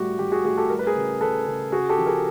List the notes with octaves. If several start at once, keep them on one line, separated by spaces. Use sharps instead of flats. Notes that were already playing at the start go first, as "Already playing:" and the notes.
Already playing: A2 G3 F#4 G4
A2 G4
F#4 G#4
A2 F#4 G#4
G4 A4
G3 A#4
B4
G#4 A#4
C#3
C#3 A4 B4
C#3
C#3 F#4 G#4
G4 A4
F3
G#4 A#4